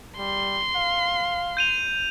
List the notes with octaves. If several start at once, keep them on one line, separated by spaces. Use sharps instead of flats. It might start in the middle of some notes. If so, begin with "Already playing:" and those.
G3 C6
F5
G6 D#7 F7